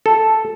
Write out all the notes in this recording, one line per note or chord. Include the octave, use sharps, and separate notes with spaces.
A4